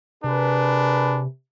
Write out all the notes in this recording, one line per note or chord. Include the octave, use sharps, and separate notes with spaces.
C3 D4 G#4 A#4 B4